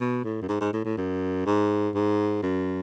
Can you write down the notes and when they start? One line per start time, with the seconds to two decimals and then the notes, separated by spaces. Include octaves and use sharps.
0.01 B2
0.24 A2
0.42 F#2
0.49 G#2
0.61 G#2
0.73 A2
0.85 A2
0.98 F#2
1.46 G#2
1.95 G#2
2.43 F#2